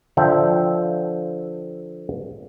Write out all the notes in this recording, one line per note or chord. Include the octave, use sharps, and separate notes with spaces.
D3 F3 E5 G5